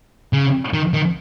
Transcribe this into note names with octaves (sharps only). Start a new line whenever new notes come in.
C#3
D#3
D#3